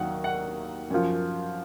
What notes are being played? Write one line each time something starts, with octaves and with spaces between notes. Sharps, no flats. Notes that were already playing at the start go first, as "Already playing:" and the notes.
Already playing: D#2 D#3 F#3 F#5
F#5
F#2 F3